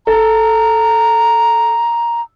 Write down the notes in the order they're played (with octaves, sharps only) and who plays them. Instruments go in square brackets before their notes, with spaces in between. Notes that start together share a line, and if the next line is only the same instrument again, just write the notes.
[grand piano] A4 [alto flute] A#5